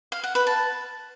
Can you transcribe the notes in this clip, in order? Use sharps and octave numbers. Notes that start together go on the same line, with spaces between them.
F5
F#5
B4
A5